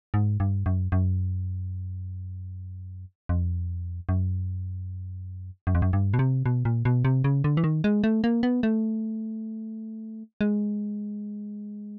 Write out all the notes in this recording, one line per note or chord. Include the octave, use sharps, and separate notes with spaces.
G#2
G2
F#2
F#2
F2
F#2
F#2
F2
F#2
G2
B2
C3
B2
A#2
B2
C3
C#3
D3
E3
D#3
G#3
A3
A#3
B3
A3
G#3